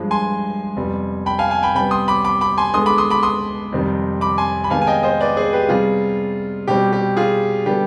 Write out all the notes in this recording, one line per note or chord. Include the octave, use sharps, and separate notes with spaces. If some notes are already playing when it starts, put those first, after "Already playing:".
Already playing: G2 F3 G#3
G#5 C6
F2 C3 G3 B3
G5 B5
F5 G#5
F5 G#5
G5 B5
C3 G3 B3 G5 B5
C6 D#6
B5 D6
B5 D6
B5 D6
G#5 C6
D3 G#3 B3 C6 D#6
B5 D6
C6 D#6
B5 D6
C6 D#6
F2 C3 D#3 G3
B5 D6
G#5 C6
B5
C3 D#3 G#3 B3 F5 G#5
G#5
D#5 G5
C5 D#5
B4 D5
G#4 C5
G4 B4
C3 G3 B3 F4 G#4
B2 G3 C4 G4
G4
F4 G#4
D3 G3 B3 G4